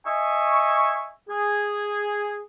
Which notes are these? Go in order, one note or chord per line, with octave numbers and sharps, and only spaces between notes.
D#5 E5 G#5 C#6
G#4